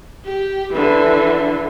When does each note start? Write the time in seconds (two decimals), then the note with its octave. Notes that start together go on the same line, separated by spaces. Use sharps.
0.25 G4
0.74 D3 E3